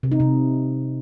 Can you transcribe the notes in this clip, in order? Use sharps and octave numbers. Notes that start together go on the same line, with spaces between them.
C3
D#4
C3